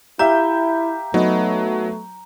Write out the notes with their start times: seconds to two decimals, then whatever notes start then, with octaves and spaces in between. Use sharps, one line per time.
0.19 E4 G4 E5 F5 A#5 G6
1.14 F#3 A3 B3 D#4